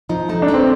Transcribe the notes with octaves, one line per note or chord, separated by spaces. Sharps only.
F3 D#4
A3 D#4
D4
A3
C4